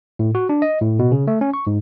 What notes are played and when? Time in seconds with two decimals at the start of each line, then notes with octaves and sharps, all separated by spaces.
0.19 A2
0.35 F#4
0.49 D4
0.62 D#5
0.81 A2
0.99 B2
1.12 C#3
1.27 A3
1.41 C#4
1.54 C#6
1.67 G#2